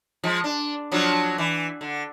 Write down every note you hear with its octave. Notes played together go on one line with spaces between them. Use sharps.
F3 G#3
D4
F3 F#3 D4
E3
D3